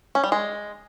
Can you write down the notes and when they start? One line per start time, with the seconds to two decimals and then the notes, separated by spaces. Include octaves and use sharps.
0.15 C#4
0.24 G3
0.32 G#3